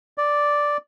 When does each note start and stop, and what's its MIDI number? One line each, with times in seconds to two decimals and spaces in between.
0.18 0.77 74